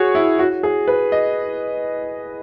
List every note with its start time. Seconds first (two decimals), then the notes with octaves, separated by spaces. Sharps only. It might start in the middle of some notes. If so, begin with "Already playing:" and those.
Already playing: F#4 G#4 C#5
0.15 E4
0.39 F#4
0.63 G#4
0.87 B4
1.12 D#5